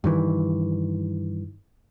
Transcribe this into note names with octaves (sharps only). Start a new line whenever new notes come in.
G2 D#3 E3